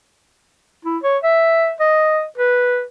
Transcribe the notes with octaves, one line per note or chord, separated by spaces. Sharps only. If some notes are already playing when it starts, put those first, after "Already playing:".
E4
C#5
E5
D#5
B4